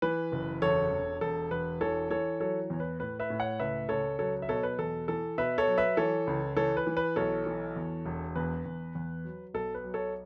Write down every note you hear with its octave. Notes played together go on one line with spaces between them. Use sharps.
E3 B4
F#1
E1 A4 C#5
E1
E1 A4
E1 B4
E3 A4 C#5
E3 A4 C#5
F#3 A4 C#5
E2 C#5
B4
A2 B4
B4 E5
A2
C#5 F#5
C#2 B4 E5
C#2 A4 C#5
F#3 A4 C#5
E5
B2 A4 C#5
B4
E2 A4
E3 A4
B2 B4 E5
A4 C#5
F#3
B4 E5
E3 A4 C#5
C#2
E3 A4 C#5
B4
E3
B4
B1 A4 C#5
E3
E2
E1
E2 B4
E2
E2
F#3
B1 A4
B4
F#3
A4 C#5